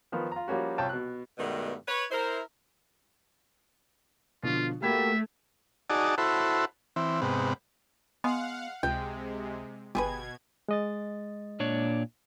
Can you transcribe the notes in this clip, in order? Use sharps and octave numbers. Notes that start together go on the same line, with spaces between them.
D#3 F3 B3
F4 A#5
F3 G3 A#3 C#4 F#4
C2 F4 C#5 G5 A5
B2 F#6
G2 B2 D#3 G#3 A3 B3
B4 C#5
E4 A#4 C5
B2 D3 F3 F4
A3 A#3 F#4 G4 E5 B5 G#6
D#4 F#4 G#4 D5 A5
E4 F#4 A4 C5 B5
E3 C4
G#2 C3 B3
G#3 B3 F5 F#5
C#2 C3 G#3 G5
G1 B2 G4 G#4 B4 G#6
G#3 D#5 A6
A#2 D4 C#5